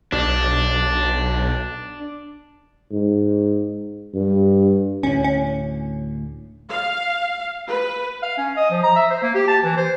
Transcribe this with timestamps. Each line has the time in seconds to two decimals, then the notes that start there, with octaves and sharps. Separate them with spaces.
0.12 B1 D4
2.91 G#2
4.14 G2
5.03 D2 A2 C#4
5.24 C#4
6.70 F5
7.69 B4
8.23 F5
8.38 C#4
8.57 D#5
8.71 F3
8.83 A#5
8.96 E5
9.10 C5
9.23 A#3
9.35 G4
9.48 A5
9.64 E3
9.77 C5